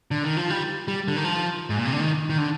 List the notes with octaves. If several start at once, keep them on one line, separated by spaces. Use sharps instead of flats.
D3
D#3
F3
G3
G3
D3
D#3
F3
G#2
A#2
C3
D3
D#3
D#3
D3